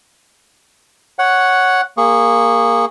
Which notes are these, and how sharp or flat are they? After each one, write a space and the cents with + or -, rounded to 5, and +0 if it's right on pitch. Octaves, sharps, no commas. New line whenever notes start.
C#5 +0 F#5 +0
A#3 +0 G#4 -20 C#6 +0